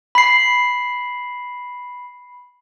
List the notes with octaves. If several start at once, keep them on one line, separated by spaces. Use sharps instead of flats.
B5 C7